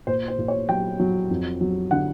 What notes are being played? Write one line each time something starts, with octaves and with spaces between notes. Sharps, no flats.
A#2 C5
C5
A#2
C#5
F#3 G5
F#3
F2
F#3
D3 F#5